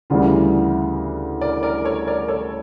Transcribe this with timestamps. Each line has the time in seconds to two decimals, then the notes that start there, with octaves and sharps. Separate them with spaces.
0.10 D2 C#3 E3 G3 D4 F4
1.41 A#4 D5
1.63 A#4 D5
1.85 A4 C#5
2.07 A#4 D5
2.28 A4 C#5